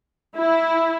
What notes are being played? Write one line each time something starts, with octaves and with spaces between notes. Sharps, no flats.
E4